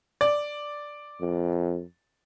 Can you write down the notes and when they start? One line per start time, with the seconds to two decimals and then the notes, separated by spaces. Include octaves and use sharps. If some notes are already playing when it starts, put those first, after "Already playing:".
0.21 D5
1.21 F2